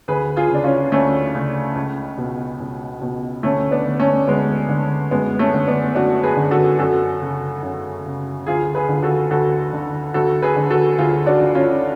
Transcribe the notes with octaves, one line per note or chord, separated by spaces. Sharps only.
D2 G#4 B4
F4 G#4
C#3 D4
C#4 F4
D2 A3 C#4
C#3
C#2
B2
C#2
B2
D2 A3 C#4
B3 D4
D3
A3 C#4
D2 G#3 B3
D3
F#2 G#3 B3
A3 C#4
D3
B3 D4
F#2 D4 F#4
G#4 B4
D3
F#4 A4
F#2 F#4 A4
C#3
F#2
C#3
D2 F4 G#4
G#4 B4
D3
F#4 A4
D2 F#4 A4
D3
D2 F#4 A4
G#4 B4
D3
F#4 A4
D2 F4 G#4
D4 F#4
D3
C#4 F4